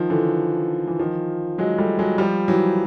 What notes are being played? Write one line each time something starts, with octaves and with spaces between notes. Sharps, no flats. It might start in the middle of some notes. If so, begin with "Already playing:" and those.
Already playing: D#3 F3
D3 E3
E3
D#3 F3
F#3 G#3
G3 A3
F#3 G#3
F3 G3
E3 F#3